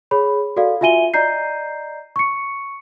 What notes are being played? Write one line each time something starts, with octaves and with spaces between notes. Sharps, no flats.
G#4 C#5 B5
F#4 A4 D5 F5
F4 F#4 E5 G#5 D#7 G7
D5 D#5 A#5 G6 C7
C#6 C#7